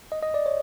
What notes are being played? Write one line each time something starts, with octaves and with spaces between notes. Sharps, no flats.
D#5
D#5
D5
C#5